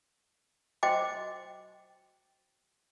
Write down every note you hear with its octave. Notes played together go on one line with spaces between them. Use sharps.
F#4 C5 D#5 G5 D6